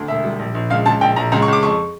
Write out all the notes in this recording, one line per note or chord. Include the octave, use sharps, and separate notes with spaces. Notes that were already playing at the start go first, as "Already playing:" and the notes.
Already playing: D2
E1 E5
G3
A#1
A#1
C#2 F5
C#2 A5
A#1 G5
A#1 A#5
C#2 A#5
C#6
C#2 D6
F2 C#6